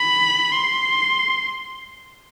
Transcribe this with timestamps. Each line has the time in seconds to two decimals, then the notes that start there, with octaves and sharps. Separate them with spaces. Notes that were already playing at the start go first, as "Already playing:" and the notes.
Already playing: B5
0.52 C6